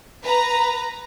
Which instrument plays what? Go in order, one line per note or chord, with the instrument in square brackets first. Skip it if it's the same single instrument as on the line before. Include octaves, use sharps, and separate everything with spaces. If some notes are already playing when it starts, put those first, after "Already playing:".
[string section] B4 A#5